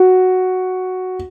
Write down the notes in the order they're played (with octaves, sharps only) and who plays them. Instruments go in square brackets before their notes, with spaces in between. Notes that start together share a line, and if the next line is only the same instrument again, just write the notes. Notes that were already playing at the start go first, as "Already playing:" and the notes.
Already playing: [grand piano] F#4